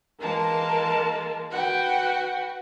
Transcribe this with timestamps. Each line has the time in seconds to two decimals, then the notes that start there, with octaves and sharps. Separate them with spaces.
0.21 E3 G#3 A#3 A#4 A5
1.51 F#4 B4 F#5 G5